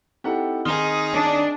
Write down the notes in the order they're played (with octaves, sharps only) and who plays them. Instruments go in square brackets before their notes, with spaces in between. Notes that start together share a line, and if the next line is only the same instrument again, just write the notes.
[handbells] C4 D#4 E4 [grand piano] G4 A4 F#5
[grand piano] D#3 C4 G7 [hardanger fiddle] D#4 G#4 [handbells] C6 D#6 F6
[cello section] D4 [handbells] D#6